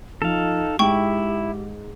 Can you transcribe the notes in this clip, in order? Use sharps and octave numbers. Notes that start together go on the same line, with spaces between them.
F3 D#4 A4 F5
G#2 E4 G4 G5 C#6